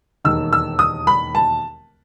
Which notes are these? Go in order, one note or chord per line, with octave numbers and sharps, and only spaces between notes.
E1 D#2 D#3 E6
E6
D#6
B5
A5